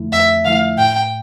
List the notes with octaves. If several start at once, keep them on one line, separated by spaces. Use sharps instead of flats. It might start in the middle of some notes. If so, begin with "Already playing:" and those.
Already playing: F2 D3 F3 A3 E4
F2 E5
D3 F3 A3 E4 F5
A2 G5